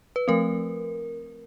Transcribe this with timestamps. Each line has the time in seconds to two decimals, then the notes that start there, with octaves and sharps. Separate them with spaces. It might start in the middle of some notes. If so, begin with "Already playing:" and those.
0.16 B4
0.28 F3 A3 C4 A#4